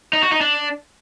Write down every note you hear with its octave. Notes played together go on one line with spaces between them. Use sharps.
D#4
F#4
D#4
D4